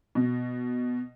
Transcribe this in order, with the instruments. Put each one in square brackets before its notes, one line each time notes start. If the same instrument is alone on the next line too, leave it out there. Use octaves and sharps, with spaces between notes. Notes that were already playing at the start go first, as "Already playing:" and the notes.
[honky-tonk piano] B2